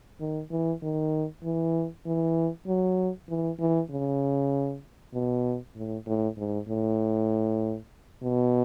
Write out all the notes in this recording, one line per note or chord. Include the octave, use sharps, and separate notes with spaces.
D#3
E3
D#3
E3
E3
F#3
E3
E3
C#3
B2
A2
A2
G#2
A2
B2